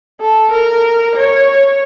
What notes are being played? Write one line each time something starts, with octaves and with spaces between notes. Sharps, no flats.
A4
A#4
C#5